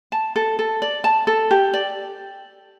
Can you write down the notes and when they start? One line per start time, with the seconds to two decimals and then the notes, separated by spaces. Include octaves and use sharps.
0.12 A5
0.36 A4
0.59 A4
0.82 D5
1.04 A5
1.27 A4
1.51 G4
1.74 D5